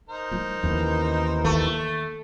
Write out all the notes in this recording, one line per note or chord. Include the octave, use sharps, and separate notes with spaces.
D#4 A#4 C5
F3 G3
D#2 E3 B3 C#4
D#3 A3 A#3